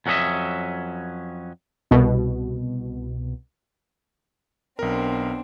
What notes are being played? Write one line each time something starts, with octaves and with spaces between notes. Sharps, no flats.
F2 F#3 C#4 D4 D#5 E5
C2 B2
B1 B3 C4 D4 A#4